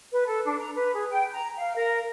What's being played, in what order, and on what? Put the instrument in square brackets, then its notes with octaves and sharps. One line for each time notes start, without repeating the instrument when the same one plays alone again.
[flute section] B4
A4
D4
A#5
B4
G#4
G5
A#5
F5
A#4